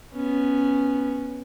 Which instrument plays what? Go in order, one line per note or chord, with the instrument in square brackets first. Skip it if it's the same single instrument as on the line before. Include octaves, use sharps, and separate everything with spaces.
[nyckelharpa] B3 C#4